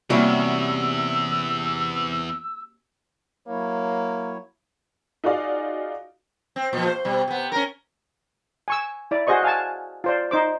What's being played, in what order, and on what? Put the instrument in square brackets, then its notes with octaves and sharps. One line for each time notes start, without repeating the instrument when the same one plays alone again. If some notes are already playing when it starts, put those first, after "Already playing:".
[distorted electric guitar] E2 [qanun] C3 A#3 F#4 [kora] G3 C#4 E4 [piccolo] E6
[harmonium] F#3 E4 C#5 [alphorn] A#3
[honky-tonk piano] D#4 F4 F#4 G#4 D5 F5
[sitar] C4
A#2 F3
C5
B2 G3
C3 B3
C#4 A#4
[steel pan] G#5 C#6 E6
E4 D5
F#4 G#4 C5 D#5 C#6
F5 G#5 A5
F4 C5 D5
D#4 C5 D6